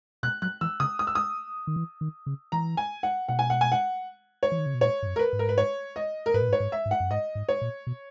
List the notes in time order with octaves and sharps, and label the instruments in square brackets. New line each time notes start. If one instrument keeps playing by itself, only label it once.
[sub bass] B2 [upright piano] F#6
[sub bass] F#3 [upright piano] F#6
[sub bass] E3 [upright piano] E6
[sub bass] C#3 [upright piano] D#6
[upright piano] D#6
E6
D#6
[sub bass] D#3
E3
D#3
C#3
[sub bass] E3 [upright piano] A#5
[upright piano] G#5
F#5
[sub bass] B2 [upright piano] F#5
[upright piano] G#5
F#5
G#5
F#5
C#5
[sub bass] E3
D#3
C#3
B2
[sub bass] A#2 [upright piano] C#5
[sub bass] G#2
F#2
[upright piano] A#4
B4
[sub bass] G#2
[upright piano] A#4
B4
C#5
D#5
A#4
[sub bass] G#2 [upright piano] B4
[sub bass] A#2
G#2
[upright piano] C#5
[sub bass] G#2
[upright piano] E5
[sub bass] G#2
[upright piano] F#5
[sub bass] F#2
[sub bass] G#2 [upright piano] D#5
[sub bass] G#2
[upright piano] C#5
[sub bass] A#2
B2